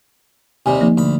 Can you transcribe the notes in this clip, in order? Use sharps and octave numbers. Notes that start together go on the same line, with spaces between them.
D#2 C3 G3 G#5
F3 A#3 D#4
D2 B5